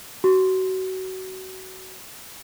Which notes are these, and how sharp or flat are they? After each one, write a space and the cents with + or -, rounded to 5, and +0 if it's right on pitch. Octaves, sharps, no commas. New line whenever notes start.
F#4 +25